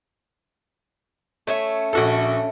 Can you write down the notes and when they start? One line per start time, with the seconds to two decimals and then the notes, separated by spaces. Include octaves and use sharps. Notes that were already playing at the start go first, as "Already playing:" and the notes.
1.47 A3 C#4 E5
1.93 A#1 F#4 A4